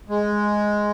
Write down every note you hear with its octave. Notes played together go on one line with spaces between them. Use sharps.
G#3